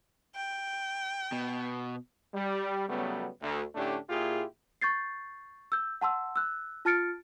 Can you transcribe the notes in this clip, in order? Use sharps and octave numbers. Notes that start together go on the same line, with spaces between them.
G5
B2
G3
C#3 F#3 G3 A3 B3
D2
A2 D3 A3 C#4 D4 G4
A#2 E4 F4 G4 G#4
C#6 G6 A6 C7
E6 G6
F#5 A5 C6 E6
E6 F#6
F4 A5 F6 A6 C#7 D7